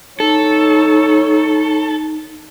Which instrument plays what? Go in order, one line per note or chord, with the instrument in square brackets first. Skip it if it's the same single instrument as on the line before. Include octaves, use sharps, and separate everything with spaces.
[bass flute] D#4 [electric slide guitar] A4 [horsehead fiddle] C#5